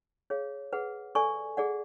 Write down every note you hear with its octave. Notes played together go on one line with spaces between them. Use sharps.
G#4 C#5 F5
G#4 B4 F#5
A4 D5 G#5 C#6
G#4 D5 F#5